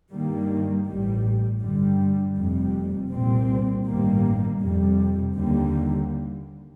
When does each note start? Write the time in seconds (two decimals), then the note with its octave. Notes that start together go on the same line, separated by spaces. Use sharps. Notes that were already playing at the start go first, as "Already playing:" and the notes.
0.12 G2 D#3 G3 A#3
0.87 A1 A2 G3
1.62 G2 D3 G3
2.37 F1 F2 C3 G3
3.11 C2 A#2 G3 C4
3.86 A1 G2 D#3 G3 A#3
4.60 F2 C3 G3
5.35 D#2 D3 G3 A#3